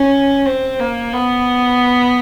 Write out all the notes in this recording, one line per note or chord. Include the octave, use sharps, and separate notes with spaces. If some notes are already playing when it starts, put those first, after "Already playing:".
Already playing: C#4
C4
A#3
B3